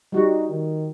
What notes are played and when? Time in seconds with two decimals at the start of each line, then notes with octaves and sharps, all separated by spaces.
0.12 G3 D#4 F#4
0.49 D#3